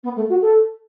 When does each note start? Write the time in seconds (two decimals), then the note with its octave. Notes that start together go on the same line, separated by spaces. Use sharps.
0.03 B3
0.16 A3
0.29 F#4
0.41 A4